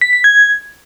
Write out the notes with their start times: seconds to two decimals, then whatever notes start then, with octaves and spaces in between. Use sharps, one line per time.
0.01 B6
0.13 B6
0.24 G#6